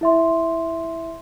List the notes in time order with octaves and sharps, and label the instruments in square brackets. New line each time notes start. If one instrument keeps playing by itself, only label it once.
[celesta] E4 E5 C6